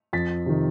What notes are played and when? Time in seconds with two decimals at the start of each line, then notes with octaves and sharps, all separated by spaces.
0.13 F2 A6 B6
0.46 C3 D#3